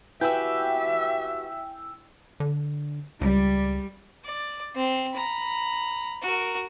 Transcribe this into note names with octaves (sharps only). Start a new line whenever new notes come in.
E4 F#4 G4 B4 E5 G5 G#5 E6
D3
C#2 G3
D5
C4
A#5 B5
F#4 A#4